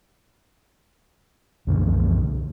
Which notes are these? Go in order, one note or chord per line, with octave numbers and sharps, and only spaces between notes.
C2 F#2 D3 E3